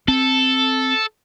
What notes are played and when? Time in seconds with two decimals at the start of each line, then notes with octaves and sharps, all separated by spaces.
0.08 C4 A4